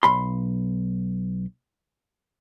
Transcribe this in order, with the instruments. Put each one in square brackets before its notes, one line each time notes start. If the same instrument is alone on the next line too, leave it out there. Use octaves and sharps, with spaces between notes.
[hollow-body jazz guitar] B1 B5 C6